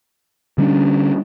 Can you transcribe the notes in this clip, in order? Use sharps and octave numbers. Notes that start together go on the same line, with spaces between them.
D3 G3 C#4 D4